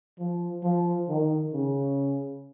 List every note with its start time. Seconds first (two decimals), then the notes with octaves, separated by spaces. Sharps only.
0.19 F3
0.63 F3
1.09 D#3
1.53 C#3